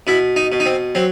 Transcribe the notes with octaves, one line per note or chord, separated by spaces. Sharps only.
B2 E4
D#4
B2
D#4
C4
F#3 C4